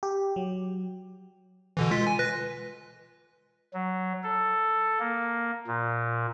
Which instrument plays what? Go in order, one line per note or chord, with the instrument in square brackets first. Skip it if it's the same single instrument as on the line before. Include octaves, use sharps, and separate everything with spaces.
[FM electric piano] G4
F#3
[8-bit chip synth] B2 D3 E3
G#3 F4 B6
G#5
B4 F#6 A#6
[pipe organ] F#3
A4
A#3
A#2